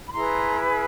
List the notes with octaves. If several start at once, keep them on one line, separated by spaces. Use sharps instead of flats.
B5
E4 G#4 B4 A#5 C6